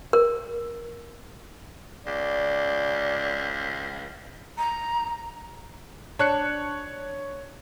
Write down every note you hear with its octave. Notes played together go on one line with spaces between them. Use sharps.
A#4
C#2 D5
A#5
D4 C#5 F#6 C#7